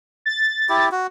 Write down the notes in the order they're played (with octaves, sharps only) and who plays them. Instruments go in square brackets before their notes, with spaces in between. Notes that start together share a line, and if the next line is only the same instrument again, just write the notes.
[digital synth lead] A6
[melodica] E4 G4
F#4